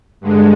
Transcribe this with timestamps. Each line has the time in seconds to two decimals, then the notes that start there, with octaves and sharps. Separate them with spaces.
0.21 G2 D3 G#3